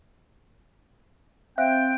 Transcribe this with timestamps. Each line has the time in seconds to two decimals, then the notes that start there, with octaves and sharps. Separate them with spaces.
1.58 C4 E5 F5 G5 F#6